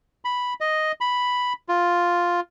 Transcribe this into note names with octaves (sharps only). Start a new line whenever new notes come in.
B5
D#5
B5
F4